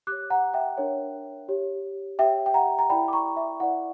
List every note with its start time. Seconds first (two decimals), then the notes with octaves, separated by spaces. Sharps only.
0.07 G4 C#5 D6 F#6
0.30 F#5 A#5
0.54 E5 G5
0.77 D4 A#4 C#5
1.49 G4 C#5
2.19 G4 C#5 E5 G5
2.46 G5
2.54 F#5 A#5
2.79 A#5
2.90 E4 A#4 D5 G5 B5
3.08 D6
3.13 A#5 C#6
3.36 E5
3.60 E4 B4 D5 F#5